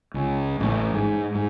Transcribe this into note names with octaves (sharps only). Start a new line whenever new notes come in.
C#2
A1
G#2
G#2